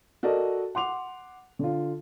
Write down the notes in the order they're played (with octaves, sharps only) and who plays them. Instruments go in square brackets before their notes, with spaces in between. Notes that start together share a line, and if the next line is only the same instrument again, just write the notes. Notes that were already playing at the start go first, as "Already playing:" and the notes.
[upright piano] F#4 A4 A#4 D5 D#5
F#5 C6 D6 F7
D3 F4